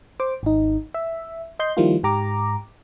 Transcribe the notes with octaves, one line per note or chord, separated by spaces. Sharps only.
C5 D6
G#1 D#4
E5
D#5 C6 G6 C7
D#3 F3 G3 A#3 E4 F4
G#2 G4 A#5 D6